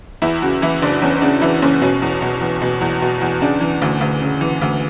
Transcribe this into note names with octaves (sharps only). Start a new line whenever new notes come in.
E2 E4
C#3 F#4
E3 E4
F#1 D4
E2 C#4
C#3 D4
E3 E4
F#1 C#4
B2 C#4
E2
B2
E2
B2
E2
B2
E2
C#3 D4
E3
D2
D2
C#3
E3
D2